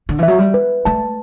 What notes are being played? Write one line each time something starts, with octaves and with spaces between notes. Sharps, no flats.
D3
E3 E5
F#3
G3
B4
A3 A5